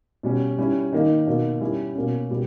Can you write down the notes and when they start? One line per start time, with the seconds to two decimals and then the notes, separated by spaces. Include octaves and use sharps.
0.23 B2 G3 C#4
0.58 G3 C#4 E4
0.93 D#3 A#3 D#4
1.27 B2 A#3 D#4
1.61 G3 C#4 E4
1.95 B2 A#3 C#4
2.30 B2 G3